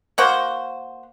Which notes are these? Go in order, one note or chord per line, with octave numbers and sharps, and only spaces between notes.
A#3 F#4 C5